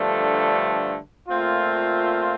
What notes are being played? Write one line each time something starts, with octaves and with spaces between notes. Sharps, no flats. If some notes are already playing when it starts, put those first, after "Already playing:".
Already playing: G2 D3 F3 A3
A#2 A3 C4 F4